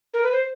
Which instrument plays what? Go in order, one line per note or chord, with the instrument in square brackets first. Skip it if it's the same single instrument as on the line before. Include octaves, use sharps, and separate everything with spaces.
[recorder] A#4
B4
C5